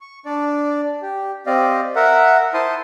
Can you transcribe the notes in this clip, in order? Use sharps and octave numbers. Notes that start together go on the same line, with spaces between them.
C#6
D4 D5
G4
C4 G4 D5 D#5 F5
A#4 E5 F#5
E4 C5 A5 C6 D#6